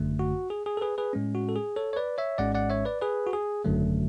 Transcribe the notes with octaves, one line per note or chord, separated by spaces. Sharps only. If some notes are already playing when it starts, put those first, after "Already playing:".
Already playing: G#1 F#2 D3 A3
F#4
G#4
G#4
A4
G#4 B4
G#4 B4
A2 G#3 C#4
F#4
A4
G#4
A4 C#5
C#5
B4 D5
C#5 E5
G#1 G#2 G#3 C#4 D5 F#5
D5 F#5
C#5 E5
B4 D5
G#4 B4
F#4
G#4
G#1 F#2 D3 F#3 A3